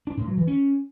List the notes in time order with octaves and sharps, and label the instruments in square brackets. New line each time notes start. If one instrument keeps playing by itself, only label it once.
[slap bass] D4
A2
F#3
E3
C#4